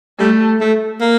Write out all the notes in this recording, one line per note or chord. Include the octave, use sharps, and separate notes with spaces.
G3 A3
A3
A#3